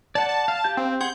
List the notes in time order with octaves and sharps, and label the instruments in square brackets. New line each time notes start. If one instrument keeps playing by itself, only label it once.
[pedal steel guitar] D5 F#5 [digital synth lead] A5
[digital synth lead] A5
[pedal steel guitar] F5
G4 F5 G6
[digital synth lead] C4
[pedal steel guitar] G#4 F#5 C6 [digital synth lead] G6